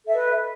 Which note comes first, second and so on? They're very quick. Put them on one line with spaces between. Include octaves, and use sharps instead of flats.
A4 E5 D#5 B4